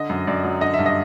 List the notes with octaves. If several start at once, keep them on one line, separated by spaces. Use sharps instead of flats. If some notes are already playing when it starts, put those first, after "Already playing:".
Already playing: D3 D#5
F#2
F#2 D5
F#3
D3 D#5
E5
G2
D#5